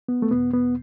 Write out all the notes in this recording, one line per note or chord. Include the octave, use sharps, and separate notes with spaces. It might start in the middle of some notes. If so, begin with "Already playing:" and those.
B3
A3
E2 B2 B3
B3